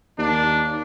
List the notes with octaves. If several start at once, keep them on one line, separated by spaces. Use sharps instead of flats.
D#2 D4